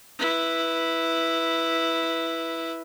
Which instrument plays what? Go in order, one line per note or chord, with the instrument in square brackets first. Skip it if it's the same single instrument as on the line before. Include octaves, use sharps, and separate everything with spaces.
[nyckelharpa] E4 B4